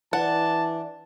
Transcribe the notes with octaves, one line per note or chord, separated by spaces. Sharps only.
E3 D4 F#5 A5